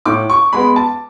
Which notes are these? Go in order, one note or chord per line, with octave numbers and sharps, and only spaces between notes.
A2 D6
C#6
G#3 B3 B5
A5